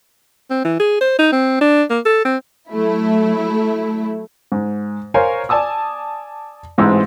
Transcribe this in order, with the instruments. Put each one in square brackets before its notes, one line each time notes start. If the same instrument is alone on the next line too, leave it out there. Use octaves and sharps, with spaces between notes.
[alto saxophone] C4
E3
G#4
C5
D#4
C4
D4
A#3
A4
C4
[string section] F#3 A3 E4
[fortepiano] G#2
A#4 C5 C#5 F5 G#5
D5 G#5 A5 D#6 E6
A1 G#2 E3 G#3 C4 E6